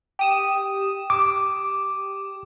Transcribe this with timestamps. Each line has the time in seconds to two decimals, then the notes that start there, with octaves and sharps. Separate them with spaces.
0.19 G4 D#6 E7
1.10 D6